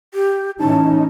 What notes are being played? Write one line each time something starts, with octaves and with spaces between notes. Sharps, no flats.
G4
A2 E3 C#4 D#4 A5